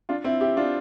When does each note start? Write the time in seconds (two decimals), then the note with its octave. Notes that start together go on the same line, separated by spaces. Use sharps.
0.09 D4 F4
0.24 C4 E4
0.41 E4 G4
0.57 D4 F4